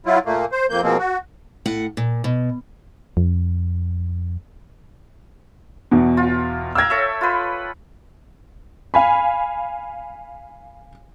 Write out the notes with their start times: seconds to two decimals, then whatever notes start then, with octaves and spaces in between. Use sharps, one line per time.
0.06 F#3 E4 F4
0.26 A#2 A3 A#3
0.52 C5
0.70 F2 A#3 G6
0.83 B2 F3 G#3 A#3 C4
0.98 F#4
1.66 A2 F#5
1.97 A#2
2.24 B2
3.17 F2
5.91 E2 B2
6.17 F4
6.75 F5 G5 A#5 E6 G#6
6.90 A4 C#5 E5
7.21 F4 B4
8.94 F5 G#5 B5